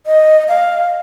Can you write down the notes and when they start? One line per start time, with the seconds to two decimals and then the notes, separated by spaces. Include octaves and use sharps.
0.06 D#5
0.48 F5